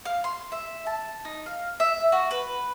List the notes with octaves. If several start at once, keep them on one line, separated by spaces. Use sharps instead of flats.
F5
C6
E5
A5
D#4
F5
E5
F#4
B4